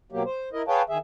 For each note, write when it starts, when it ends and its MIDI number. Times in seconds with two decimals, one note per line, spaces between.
0.12 0.23 47
0.12 0.23 54
0.12 0.23 58
0.12 0.23 67
0.25 0.49 72
0.53 0.62 64
0.53 0.62 70
0.53 0.62 75
0.68 0.82 68
0.68 0.82 71
0.68 0.82 73
0.68 0.82 77
0.68 0.82 79
0.68 0.82 81
0.89 0.98 51
0.89 0.98 68
0.89 0.98 76